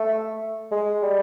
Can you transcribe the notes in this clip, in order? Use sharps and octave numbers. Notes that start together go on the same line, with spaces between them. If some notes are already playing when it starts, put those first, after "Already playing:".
Already playing: A3
G#3
G3